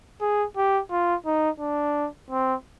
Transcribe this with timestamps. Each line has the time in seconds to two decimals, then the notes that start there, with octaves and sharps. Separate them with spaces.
0.21 G#4
0.57 G4
0.91 F4
1.26 D#4
1.60 D4
2.31 C4